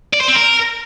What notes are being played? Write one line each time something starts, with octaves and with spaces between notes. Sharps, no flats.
D5
C5
C4
A#4